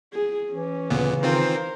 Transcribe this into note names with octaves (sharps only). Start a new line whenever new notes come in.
G#4
E3 C#4
D2 A#2 C#3 B3
D#3 C4 F4 A#4 C5